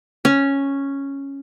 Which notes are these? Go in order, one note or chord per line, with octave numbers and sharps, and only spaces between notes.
C#4